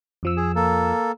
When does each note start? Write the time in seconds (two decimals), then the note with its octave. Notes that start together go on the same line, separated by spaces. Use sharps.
0.23 F2 F3 E6
0.37 G#4
0.56 A#3 A4